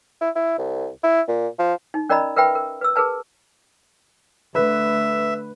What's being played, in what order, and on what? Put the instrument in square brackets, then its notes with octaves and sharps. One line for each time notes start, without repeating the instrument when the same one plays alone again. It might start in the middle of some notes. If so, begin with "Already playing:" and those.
[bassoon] E4
E4
C2
E4
A#2
F3
[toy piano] D#4
C#4 A#4 D5 D#5 A#5 B5
A#4 B4 E5 G5 B5
A#4
B4 E6
G#4 A#4 B4 A5
[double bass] D3 A3 [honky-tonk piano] B4 [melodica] E5